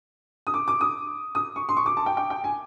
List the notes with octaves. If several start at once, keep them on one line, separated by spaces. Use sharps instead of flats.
D#6
D6
D6
D#6
D#6
C#6
C6
C#6
D6
A5
G5
G5
G5
G#5